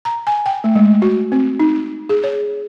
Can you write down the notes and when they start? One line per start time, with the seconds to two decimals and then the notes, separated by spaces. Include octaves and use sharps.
0.05 A#5
0.27 G#5
0.46 G5
0.64 A3
0.75 G#3
1.02 F#4
1.32 C4
1.60 D#4
2.09 G#4
2.24 C#5